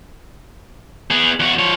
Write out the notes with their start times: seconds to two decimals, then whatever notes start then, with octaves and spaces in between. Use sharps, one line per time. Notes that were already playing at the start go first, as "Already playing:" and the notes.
1.11 B3 G#4
1.40 E2 F#4
1.59 F3 C#5